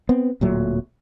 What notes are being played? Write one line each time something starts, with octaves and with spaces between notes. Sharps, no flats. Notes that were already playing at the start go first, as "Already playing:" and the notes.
B3 C4
D1 A#2 F#3 A3